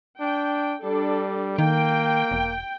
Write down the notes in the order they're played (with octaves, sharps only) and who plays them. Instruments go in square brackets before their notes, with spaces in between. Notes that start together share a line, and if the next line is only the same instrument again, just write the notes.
[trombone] D4 [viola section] G5
[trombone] G3 [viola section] D4 A4
[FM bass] D#3 [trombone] A#3 [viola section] G5
[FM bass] E1